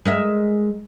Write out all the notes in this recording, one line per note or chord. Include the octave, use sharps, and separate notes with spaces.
G#3 A#4 E5